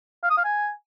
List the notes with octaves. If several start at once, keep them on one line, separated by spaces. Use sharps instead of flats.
F5
D#6
F5
G#5